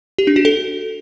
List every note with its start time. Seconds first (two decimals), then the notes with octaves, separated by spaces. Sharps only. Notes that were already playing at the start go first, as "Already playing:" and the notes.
0.18 G4
0.27 D4
0.36 F#4
0.45 A4